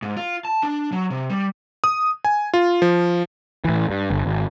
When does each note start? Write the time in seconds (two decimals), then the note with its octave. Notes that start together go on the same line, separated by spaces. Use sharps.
0.02 G#2
0.17 F4
0.45 A5
0.63 D4
0.92 F#3
1.10 C3
1.30 G3
1.84 D#6
2.25 G#5
2.54 F4
2.82 F3
3.65 A2 E3
3.90 G2
4.10 G1
4.26 G#1